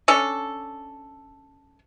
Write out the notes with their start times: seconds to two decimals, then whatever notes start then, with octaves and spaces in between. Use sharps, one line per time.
0.08 C#4 D4 A4